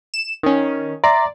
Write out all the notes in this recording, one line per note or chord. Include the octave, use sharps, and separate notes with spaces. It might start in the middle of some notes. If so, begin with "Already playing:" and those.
E7
D#3 C#4
D5 E5 A#5 C6